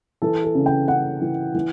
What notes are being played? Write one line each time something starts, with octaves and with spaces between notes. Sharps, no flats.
E3 A4
A4
C#3
G5
C#3 F#5
E3
E3